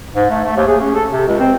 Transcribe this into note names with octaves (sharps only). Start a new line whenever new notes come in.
G#2
A3
A3
D#2
G#4
C#4
A4
C3
C#2
C4